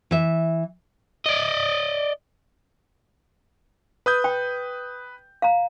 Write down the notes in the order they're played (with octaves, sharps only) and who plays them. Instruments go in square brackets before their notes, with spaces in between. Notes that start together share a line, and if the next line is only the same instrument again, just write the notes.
[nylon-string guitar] E3 E5
[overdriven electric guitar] D5 D#5
[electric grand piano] B4 D#6 G6
[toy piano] G5
F5 A#5